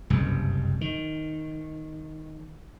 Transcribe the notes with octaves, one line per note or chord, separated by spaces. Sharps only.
F#1 C2 G2
D#3